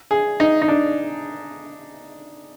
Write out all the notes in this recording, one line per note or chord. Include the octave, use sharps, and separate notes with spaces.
G#4
D#4
D#4
D4